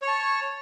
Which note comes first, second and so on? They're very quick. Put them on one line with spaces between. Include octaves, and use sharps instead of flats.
C#5 C#6 A5